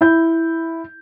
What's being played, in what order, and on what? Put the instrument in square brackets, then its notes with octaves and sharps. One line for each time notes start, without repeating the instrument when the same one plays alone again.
[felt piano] E4 G6